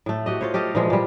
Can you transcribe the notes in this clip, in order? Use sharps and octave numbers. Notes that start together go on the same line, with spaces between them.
A2 A3
F#4 G4 D#5
F4 C5 C#5
G4 A4 D#5 F5
A#2 E3 F3 G#3
A#2 G3